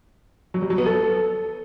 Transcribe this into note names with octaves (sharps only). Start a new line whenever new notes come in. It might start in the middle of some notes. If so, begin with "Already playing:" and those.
F#3
G3
F#3
B3
A4